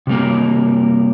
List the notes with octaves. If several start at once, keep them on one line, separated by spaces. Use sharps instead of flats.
C3 G3 A#3